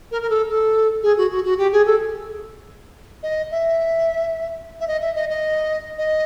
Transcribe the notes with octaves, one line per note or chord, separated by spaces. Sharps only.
A#4
A#4
A4
A4
G#4
F#4
F#4
F#4
G4
G#4
A4
D#5
E5
E5
D#5
E5
D#5
D#5
D#5